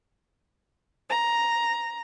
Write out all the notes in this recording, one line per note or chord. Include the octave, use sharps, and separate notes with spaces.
A#5